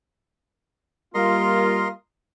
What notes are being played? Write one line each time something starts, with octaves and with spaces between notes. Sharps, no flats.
G3 A#3 F4 A#4 D#5 C6